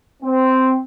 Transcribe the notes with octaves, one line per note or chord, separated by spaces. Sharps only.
C4